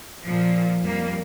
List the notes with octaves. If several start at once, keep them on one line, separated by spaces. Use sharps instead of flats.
A#2 F3
F2 G3 A#3